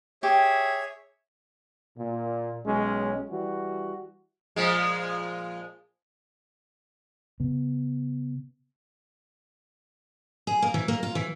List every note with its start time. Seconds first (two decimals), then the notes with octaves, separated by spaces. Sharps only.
0.23 G4 G#4 C#5 E5
1.98 A#2
2.65 B1 G#3 C#4
3.30 E3 G3 F#4
4.56 A#2 F3 G#3
7.40 C#3 B3
10.47 G#4
10.62 A#3
10.74 E3
10.88 A#3
11.03 F4
11.15 E3